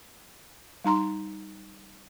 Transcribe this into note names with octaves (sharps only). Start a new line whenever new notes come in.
G3 D#4 A#5 C6